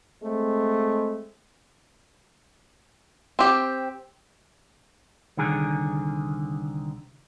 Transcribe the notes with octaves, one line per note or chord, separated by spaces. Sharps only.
G#3 A3 C4
C4 G4
C2 D3 D#3 G#4